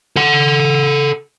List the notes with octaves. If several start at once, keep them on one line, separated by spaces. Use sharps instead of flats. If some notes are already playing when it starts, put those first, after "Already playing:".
A4 F#5